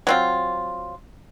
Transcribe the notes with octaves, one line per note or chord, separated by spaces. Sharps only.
F#3 C4 F4